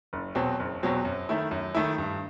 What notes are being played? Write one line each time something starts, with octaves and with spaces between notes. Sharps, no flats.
F#1
E2 B2 F#3 C4
F#1
E2 B2 F#3 C4
F#2
D#3 A3 E4
F#2
D#3 A3 E4
G2